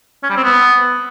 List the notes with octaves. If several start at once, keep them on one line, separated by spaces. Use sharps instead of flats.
C#4
G3
C4
B3